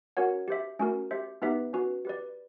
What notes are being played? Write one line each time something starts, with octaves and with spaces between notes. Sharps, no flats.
C#4 F#4 A#4 C#5 F#5
G4 C5 E5
A3 C#4 F#4 A#4
G4 C5 E5
B3 D#4 G4 B4 E5
C#4 F#4 B4
G4 B4 D5